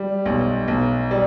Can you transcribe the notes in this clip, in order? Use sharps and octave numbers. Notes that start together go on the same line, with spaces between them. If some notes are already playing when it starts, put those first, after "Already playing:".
Already playing: G3
B1
B1
G3